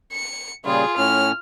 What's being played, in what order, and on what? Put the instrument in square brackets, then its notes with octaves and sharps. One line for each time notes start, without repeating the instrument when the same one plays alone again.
[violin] C#7
[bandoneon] A#2 C#3 G3 [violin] F4 G#4
[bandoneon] A2 C#4 [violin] F6